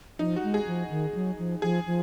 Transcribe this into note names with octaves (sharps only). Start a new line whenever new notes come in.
F3 D#4
F#4
G#3
G#4
F3
D#3
F#3
F3
F3 G#4
F3